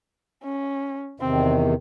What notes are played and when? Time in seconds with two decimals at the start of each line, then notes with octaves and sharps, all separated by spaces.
0.44 C#4
1.20 E2 C3 D#3 C4